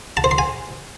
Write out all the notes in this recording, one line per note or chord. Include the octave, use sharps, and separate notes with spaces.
A5
C5
C6
G#5